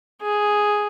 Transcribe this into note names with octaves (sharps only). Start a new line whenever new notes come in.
G#4